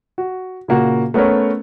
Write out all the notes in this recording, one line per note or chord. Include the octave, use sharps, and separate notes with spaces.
F#4
A#2 C#3 A#3 F#4
A3 B3 C#4 A#4 C#5